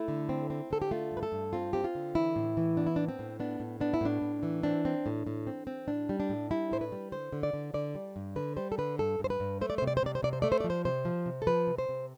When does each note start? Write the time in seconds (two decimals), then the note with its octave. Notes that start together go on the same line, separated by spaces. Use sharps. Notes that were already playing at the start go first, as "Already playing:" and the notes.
Already playing: A3 E4
0.08 D3
0.29 C4
0.50 C4
0.71 D3 A4
0.82 G4
0.91 A3 F4
1.11 G2
1.17 B4
1.23 A4
1.32 G2
1.53 C4 F4
1.73 C4 G4
1.84 F4
1.95 D3
2.15 E3 E4
2.36 A2
2.57 E3
2.77 B3 D4
2.87 E4
2.96 A2 D4
3.08 C4
3.19 A2
3.40 B3 D4
3.60 A2
3.80 B3 D4
3.94 E4
4.01 A2 D4
4.22 A2
4.43 E3
4.63 C4 D4
4.85 C4
5.06 A2
5.27 A2
5.47 C4
5.67 C4
5.88 A2 D4
6.09 G3
6.20 D4
6.29 A2
6.51 G3 E4
6.71 A2 C5
6.81 B4
6.92 G3
7.12 D3 C5
7.33 D3
7.43 D5
7.53 D3
7.74 D3 D5
7.95 G3
8.16 G2
8.36 D3 B4
8.57 G3 C5
8.72 A4
8.78 D3 B4
8.98 G2 A4
9.19 G2
9.24 C5
9.30 B4
9.40 G2
9.61 A3 C5
9.70 D5
9.78 C3 C5
9.87 D5
9.97 C5
10.03 C3 D5
10.15 C5
10.23 C3 D5
10.33 C5
10.42 A3 D5
10.52 C5
10.60 F3 D5
10.70 C5
10.85 C3 C5
11.05 F3
11.26 C3
11.42 A4
11.47 F3 B4
11.67 C3
11.78 C5
11.89 C3